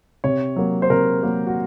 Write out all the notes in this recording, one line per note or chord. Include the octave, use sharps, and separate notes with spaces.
C3 C#5
F#3 A#3
C5
C3 A#4
F#3 A#3
F#4